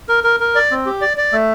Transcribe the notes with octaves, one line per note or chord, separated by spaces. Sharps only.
A#4
A#4
A#4
D5
C4
G4
D5
D5
A3